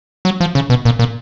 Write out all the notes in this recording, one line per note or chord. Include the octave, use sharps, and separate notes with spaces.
F#3
F3
C#3
B2
A#2
A#2